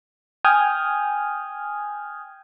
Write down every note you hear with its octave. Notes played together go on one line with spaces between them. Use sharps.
G5 G#5 D#6 F6 G6 G#6